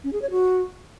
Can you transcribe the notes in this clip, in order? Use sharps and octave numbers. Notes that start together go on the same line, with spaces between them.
C#4
G#4
C#5
F#4